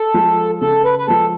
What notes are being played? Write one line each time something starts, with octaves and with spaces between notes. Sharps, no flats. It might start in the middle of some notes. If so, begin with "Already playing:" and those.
Already playing: A4
F3 G#3
C#3 A4
B4
B4
F3 G#3 A4